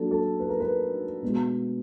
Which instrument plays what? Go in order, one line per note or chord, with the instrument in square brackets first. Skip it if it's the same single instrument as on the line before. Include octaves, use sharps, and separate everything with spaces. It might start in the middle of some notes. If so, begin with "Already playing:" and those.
Already playing: [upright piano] F#3 A#3 D4 F4 A4
A4
B4
A#4
B4
B2 G#3 B3